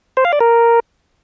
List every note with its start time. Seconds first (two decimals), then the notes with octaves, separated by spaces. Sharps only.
0.17 C5
0.25 F5
0.33 D5
0.40 A#4